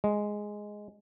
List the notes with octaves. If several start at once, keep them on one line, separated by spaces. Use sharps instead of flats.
G#3